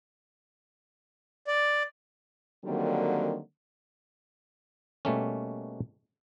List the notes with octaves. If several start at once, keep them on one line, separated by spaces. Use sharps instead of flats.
D5
D3 D#3 F#3 G3 A#3 C4
B2 G3 A3 A#3 C#4